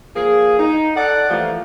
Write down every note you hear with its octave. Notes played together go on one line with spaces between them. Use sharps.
F3 A#3 G#4
D#4
A4 D5 F#5
E3 F3 G3 A3 A#3